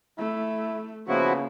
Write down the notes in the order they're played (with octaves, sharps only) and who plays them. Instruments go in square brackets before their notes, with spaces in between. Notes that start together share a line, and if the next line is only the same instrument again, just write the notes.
[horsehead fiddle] A3 [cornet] E4
[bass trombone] C#3 [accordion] F3 E4 F#4 [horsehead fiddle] A#3 [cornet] B3